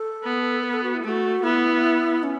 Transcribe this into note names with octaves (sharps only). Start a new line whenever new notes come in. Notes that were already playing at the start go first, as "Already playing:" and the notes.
Already playing: A4
B3
B4
A4
F#4
E4
A3 A4
F#4
B3 E4
C#4